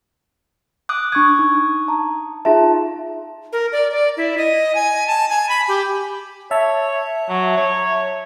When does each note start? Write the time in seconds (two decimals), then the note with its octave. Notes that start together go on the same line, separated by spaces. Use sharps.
0.89 D6 D#6 F#6
1.12 D4 C#6 D#6 G#6
1.39 D#4
1.88 A5 A#5
2.45 D#4 F4 G#4 E5 A5
3.53 A#4
3.73 D5
3.92 D5
4.17 E4
4.38 D#5
4.75 G#5
5.07 A5
5.29 G#5
5.49 B5
5.68 G4
6.51 C#5 E5 A5
7.29 F#3
7.57 C#5